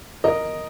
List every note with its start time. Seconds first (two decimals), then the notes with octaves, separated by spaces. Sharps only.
0.24 A#4 D#5